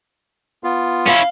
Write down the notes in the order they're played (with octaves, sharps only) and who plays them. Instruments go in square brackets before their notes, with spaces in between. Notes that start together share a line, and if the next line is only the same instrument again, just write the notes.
[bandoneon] B3 F4
[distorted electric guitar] C#4 E4 [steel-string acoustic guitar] F5